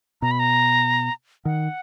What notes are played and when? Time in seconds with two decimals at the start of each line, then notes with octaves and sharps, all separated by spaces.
0.22 B2 A#5
0.31 B5
0.39 A#5
1.45 D#3 F#5